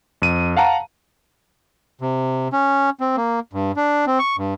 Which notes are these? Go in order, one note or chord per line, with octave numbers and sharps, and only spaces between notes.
F2 D#7
F5 F#5 A5 A#5
C3
C#4
C4
A#3
G2
D4
C4
C#6
G2